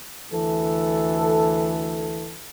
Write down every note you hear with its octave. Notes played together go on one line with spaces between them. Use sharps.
D2 E3 A4